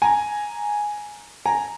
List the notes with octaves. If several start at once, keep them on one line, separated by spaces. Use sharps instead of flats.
G#5 A#5
G#5 A#5